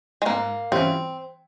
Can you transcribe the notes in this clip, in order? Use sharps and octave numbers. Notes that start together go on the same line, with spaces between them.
G#3
G#2 A#3
E3 G3 C4 C#4 F4